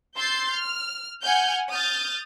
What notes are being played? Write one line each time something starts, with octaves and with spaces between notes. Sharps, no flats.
C6 E6 G6 A6 C7
F6
F#5 G#5 F6 G6
D#6 F6 G6 A6